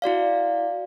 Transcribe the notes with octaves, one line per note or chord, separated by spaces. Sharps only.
E4 F#4 D5 F5